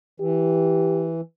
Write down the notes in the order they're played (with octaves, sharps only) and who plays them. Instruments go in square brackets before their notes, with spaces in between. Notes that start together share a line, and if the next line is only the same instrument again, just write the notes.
[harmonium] E3 [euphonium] G4